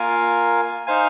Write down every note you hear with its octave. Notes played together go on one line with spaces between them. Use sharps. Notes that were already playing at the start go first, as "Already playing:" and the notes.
Already playing: A#3 F4 A#4 F5 G#5
D#4 C5 F5 G#5